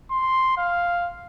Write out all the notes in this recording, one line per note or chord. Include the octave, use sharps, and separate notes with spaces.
C6
F5